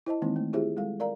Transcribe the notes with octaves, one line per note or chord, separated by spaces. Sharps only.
E4 C5 D#5 A5
D#3 E3 G#3 A#3 C4 D#4
A3
E4 F4 G4 G#4 C5 E5
G3 G#3 A4 F5
A#4 D5 F5 A#5